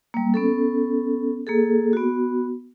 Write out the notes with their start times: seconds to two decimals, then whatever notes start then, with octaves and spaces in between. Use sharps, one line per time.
0.14 G3 A#3
0.34 B3 C#4 A4
1.47 A#3 G#4 A4
1.93 B3 F#4